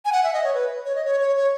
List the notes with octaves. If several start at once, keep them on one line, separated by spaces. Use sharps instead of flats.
G#5
F#5
E5
D#5
C#5
B4
C#5
D#5
C#5
C#5
C#5